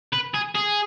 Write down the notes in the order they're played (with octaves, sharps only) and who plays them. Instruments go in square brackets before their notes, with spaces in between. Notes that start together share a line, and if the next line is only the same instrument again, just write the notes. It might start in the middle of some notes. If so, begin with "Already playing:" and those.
[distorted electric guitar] B4
G#4
G#4